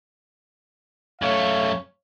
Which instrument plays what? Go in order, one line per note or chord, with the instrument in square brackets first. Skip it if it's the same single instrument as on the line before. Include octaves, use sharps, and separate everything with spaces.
[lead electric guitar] F#2 A3 [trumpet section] C#5 F5